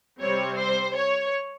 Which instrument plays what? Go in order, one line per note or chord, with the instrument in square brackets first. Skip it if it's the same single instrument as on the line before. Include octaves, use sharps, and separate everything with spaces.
[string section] C3 G3 C4 C#5
C5
C#5